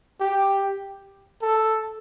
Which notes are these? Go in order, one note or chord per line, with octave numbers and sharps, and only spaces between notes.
G4
A4